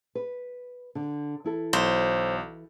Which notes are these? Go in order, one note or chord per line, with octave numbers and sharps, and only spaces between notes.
B4
D3
E3 E4 A4
B1 C5